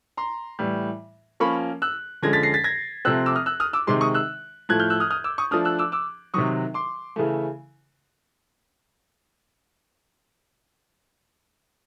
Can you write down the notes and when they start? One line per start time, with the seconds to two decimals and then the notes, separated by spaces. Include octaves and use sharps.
0.17 A#5 C6
0.59 A2 E3 G3
1.40 F3 A#3 C#4 B5 C#6
1.82 E6 F#6
2.23 D3 F3 G#3 C#4 G#6 A#6
2.33 A6 B6
2.43 A#6 C7
2.54 A6 B6
2.64 G#6 A#6
3.05 C3 F3 A3 C4 E6 F#6
3.26 D6 E6
3.36 D#6 F6
3.46 E6 F#6
3.60 D#6 F6
3.73 D6 E6
3.87 C3 D#3 G#3 C6 D6
4.01 C#6 D#6
4.14 E6 F#6
4.69 A2 F3 A3 F#6 G#6
4.80 F6 G6
4.90 E6 F#6
5.00 D#6 F6
5.11 D#6 F6
5.24 D6 E6
5.38 C#6 D#6
5.51 F3 A3 D4 D#6 F6
5.65 E6 F#6
5.79 D6 E6
5.92 D6 E6
6.34 C3 D#3 F#3 C#6 D#6
6.74 C6 D6
7.16 C#3 E3 A3